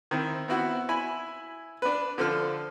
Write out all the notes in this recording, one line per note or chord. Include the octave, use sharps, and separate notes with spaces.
D#3 C4 E4
B3 C4 E4 F#4
E4 G#5 B5
D4 B4
D3 F3 A4 F6